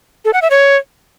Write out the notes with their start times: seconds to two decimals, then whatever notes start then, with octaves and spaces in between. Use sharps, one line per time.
0.25 A4
0.33 F#5
0.42 E5
0.51 C#5